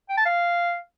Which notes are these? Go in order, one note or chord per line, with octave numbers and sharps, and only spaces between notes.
G5
A5
F5